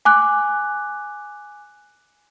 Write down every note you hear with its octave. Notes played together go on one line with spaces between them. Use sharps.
G#5 D6 F#6